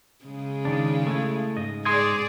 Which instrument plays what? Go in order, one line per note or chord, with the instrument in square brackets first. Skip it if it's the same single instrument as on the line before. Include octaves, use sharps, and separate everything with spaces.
[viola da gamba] C#3 G#3
[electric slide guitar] D#3 D4
A3 E4
G#2 D#5
[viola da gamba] G#4 D5 [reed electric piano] C6 D#6 G#6